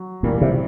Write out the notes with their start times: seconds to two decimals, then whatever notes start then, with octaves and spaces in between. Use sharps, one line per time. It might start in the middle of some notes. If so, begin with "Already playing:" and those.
Already playing: F#3
0.23 G2 A#2 E3 G3 A#3
0.41 C3